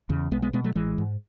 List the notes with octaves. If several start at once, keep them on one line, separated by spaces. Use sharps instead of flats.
E2 C#3
B1 G#3 B3
G#3 B3
B2 G#3 B3
F#3 A3
A1 E3 G#3
G#2